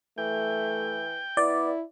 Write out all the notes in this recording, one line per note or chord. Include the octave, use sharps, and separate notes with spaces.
E3 A3 G5
B3 E4 D5